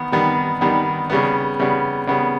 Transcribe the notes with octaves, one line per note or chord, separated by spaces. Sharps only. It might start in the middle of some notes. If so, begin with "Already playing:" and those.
Already playing: D#3 B3
D#3 G3 B3
D#3 G3 B3
C#3 G3 B3
C#3 G3 B3
C#3 G3 B3